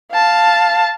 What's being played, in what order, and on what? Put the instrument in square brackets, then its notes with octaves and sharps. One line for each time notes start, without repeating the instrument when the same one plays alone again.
[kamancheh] F5 A5